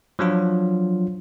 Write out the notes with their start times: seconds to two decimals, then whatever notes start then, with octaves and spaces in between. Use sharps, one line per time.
0.19 F3 F#3 D4 F4